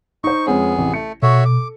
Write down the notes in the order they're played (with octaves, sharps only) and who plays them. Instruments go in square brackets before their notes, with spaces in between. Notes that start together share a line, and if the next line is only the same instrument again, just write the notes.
[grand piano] D#4 C5 [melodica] C#6
[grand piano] F2 G#3 C#4 [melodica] B3 G#4
[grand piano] A1 C3
[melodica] A3 [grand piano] C#7
[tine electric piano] B2 [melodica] F#4 C#5 E5 [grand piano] A4
[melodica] D6